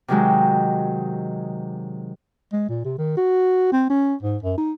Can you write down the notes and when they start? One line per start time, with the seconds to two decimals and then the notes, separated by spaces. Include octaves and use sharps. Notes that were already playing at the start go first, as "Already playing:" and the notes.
0.08 C3 D#3 F#3 G#3
2.53 G#3
2.69 A#2
2.85 C3
2.98 D#3
3.17 F#4
3.72 C4
3.90 C#4
4.23 G#2
4.43 F#2
4.58 D#4